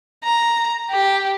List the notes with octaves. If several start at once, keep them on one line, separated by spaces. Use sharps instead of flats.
A#5
G4